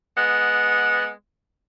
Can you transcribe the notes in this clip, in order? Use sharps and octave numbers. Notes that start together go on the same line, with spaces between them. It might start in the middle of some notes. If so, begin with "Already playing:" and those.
G#3 B3 F#5